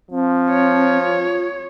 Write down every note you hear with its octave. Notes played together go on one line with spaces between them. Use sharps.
F3 C4
C#5
F4